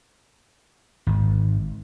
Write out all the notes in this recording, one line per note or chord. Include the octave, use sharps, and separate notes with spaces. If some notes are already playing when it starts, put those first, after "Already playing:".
G#1